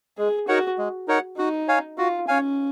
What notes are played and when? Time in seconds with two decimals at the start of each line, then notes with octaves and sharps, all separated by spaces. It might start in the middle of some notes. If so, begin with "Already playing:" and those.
0.18 G#3 G#4
0.48 D#4 F#4 A#4 C#5 F#5
0.78 G#3
1.08 D#4 A#4 C#5 F#5
1.37 D#4 F#4
1.68 C#5 F5 G#5
1.98 F4 F#4
2.28 C#4 C#5 F5 G#5